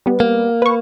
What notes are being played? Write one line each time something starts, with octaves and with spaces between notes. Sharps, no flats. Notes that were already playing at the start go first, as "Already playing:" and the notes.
G3 B3
A#3
B4 C#6